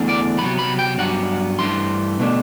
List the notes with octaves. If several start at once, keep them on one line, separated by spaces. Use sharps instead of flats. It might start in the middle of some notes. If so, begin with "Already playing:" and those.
Already playing: E2 D3 A3 D4
D5
C3 F#3 B3 B5
B5
G5
G2 F#3 B3 D4 F#5
G2 E3 A3 D4 C6
B2 A3 D4